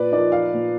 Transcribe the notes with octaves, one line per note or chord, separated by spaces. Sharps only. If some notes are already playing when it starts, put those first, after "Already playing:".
Already playing: A#2 B4 D5
F3 A#3 D#4 D5
F5
A#2